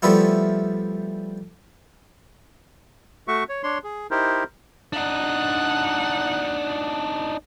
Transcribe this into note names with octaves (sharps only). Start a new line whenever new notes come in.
F3 G3 A3 B3 E4 F4
A3 F#4 E5 C#6
C#5
D4 C#5 C6
G#4
D#4 E4 G4 A#4 C5
D4 D#4 F#5